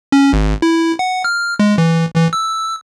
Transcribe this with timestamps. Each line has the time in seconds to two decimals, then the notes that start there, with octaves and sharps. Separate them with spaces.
0.12 C#4
0.33 G#1
0.62 E4
0.99 F#5
1.24 F6
1.59 G#3
1.78 E3
2.16 E3
2.33 E6